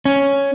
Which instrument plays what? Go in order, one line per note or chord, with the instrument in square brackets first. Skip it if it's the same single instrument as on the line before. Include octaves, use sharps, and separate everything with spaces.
[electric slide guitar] C#4